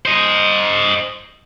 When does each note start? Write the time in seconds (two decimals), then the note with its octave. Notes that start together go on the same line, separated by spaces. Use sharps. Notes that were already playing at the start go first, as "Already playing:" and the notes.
0.06 C5 D#5